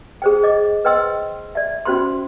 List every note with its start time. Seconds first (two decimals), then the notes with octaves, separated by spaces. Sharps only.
0.22 G#4 C5 G5
0.43 D#5 D6
0.85 B4 C5 D#5 G5 C6 E6
1.55 D5 E5
1.85 C#4 F#4 C5 B5 C6